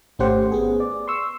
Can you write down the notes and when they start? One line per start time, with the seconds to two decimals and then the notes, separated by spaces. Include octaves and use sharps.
0.19 G#1 A3 C#4 G4 C5 F#5
0.52 B3 G#4
0.80 D5
1.08 C6 C#6 E6